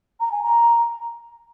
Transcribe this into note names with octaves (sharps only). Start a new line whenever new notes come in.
A#5
G#5
A#5